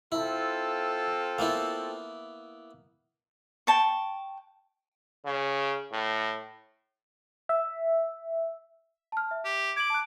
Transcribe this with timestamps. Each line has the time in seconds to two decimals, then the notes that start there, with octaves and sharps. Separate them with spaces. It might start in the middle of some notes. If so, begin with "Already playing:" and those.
0.12 C4 E4 F4 A4
1.38 A#3 B3 E4
3.67 G5 A5 C#6
5.26 C#3
5.93 A2
7.49 E5
9.12 A5 F6
9.31 E5
9.45 G4
9.76 D6 G#6 F#7
9.90 A5 F#6